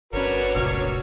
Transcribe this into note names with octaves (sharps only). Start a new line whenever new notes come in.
G1 C#4 D4 F#4 A#4 B4 C#5
E1 A1 C3 F#3 F6